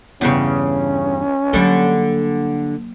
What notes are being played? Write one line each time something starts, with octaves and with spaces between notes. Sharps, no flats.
E2 G2 C#3 C#4
D3 F#3 G3 A#3